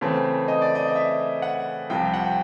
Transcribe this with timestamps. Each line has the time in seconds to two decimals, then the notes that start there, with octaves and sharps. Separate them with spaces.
0.01 C#3 E3 A3 C4
0.48 D#5
0.62 D5
0.75 D#5
0.88 D#5
0.95 E5
1.42 F#5
1.90 C2 C3 F3 G5
2.14 F#5
2.25 G5